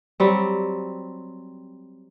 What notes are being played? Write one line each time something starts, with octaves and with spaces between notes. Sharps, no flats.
F#3 G3 C4